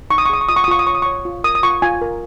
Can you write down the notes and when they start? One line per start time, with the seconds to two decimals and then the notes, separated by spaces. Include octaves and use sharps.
0.10 D#4 C#6
0.18 D#6
0.26 C#6
0.30 G#4 D#6
0.41 C#6
0.49 F4 D#6
0.56 C#6
0.64 D#6
0.68 F4 C#6
0.79 D#6
0.87 C#5 C#6
0.95 D#6
1.02 C#5 C#6
1.25 F4
1.44 A#4 D#6
1.55 D#6
1.63 F4 C#6
1.82 F4 G#5
2.02 A#4